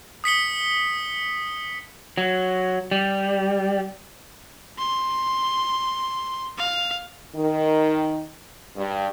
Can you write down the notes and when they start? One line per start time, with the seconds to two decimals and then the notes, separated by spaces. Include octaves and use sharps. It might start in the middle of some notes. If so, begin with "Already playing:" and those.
0.24 D#6 B6 C#7 G7
2.18 F#3
2.91 G3
4.78 C6
6.58 F5
7.34 D#3
8.76 G2